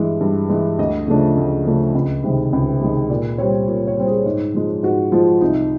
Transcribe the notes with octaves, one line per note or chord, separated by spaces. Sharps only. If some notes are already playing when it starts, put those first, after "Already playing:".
Already playing: G2 E3 G#3
G2
E3 G#3
D2 D#5
C#3 F3 A3 D4
D2
C#3 F3 A3 D4
C#2
C3 D#3 G#3
C#2
C3 D#3 G#3
A#2 D5
G3 C4 C#5
A#2
C#5
G3 C4
G#4
G#2
F3 G#3
G#2 F#4
F3 G#3 F4
C2 D#4